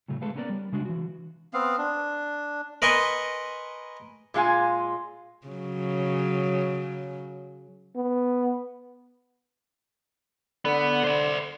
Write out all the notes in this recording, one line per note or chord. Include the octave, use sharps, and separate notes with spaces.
A2 C#3 F#3 A3
G#3 G#4 A4 B4 F5
A#3 B3 C#4 A#4 B4 D5
G3
C#3 G#3 D4 F#4
E3 F#4
B3 C4 F5
D4
A#4 B4 D#5 G#5 C6 C#6
A#2 G#3 F4 G#5
C#3 F#3
B3
D3 B3
C5 D5